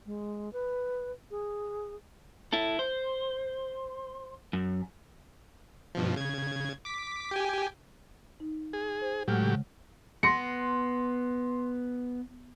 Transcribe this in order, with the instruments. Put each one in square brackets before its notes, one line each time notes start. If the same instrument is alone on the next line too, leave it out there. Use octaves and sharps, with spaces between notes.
[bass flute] G#3
B4
G#4
[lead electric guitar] E4 A4
C5
F#2
[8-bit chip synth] G2 B2 F3
C#3 G#6
D6 B6
G4 G5 G#5
[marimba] D#4
[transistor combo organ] G#4
[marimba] C5
[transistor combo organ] A2 F#3 G4 [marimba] G#3 F#5 F6
[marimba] C#3
[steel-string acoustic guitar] B3 [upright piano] C6 A#6 C#7